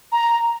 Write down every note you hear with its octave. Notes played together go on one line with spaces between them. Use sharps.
A#5